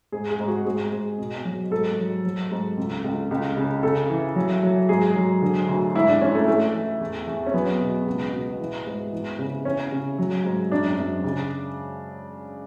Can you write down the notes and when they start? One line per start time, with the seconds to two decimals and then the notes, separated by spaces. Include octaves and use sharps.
0.12 G#2 G#4
0.31 G#4
0.39 G#2
0.48 F#4
0.65 G#2 G#4
0.92 G#2
1.18 B2
1.45 F#3
1.71 G#2 A4
1.98 F#3
2.25 F#3
2.51 G#2
2.77 C#2
3.04 C#2
3.31 C#2
3.57 C#3
3.83 C#3 A4
4.10 E3
4.36 F#3
4.63 F#3
4.89 G#2 G#4
5.16 F#3
5.42 D3
5.69 D2
5.95 G#2 E4
6.08 D4
6.21 E3 C#4
6.35 A3
6.48 E3 A3
6.74 E3
7.01 E2
7.27 E2
7.46 C#4
7.53 F#3 B3
7.80 B2
8.07 C#2
8.33 B2
8.60 E3
8.87 G#2
9.13 E3
9.39 C#3
9.65 E3 C#4
9.92 C#3
10.19 F#3
10.45 G#2
10.71 F#2 D4
10.98 F#2
11.24 C#3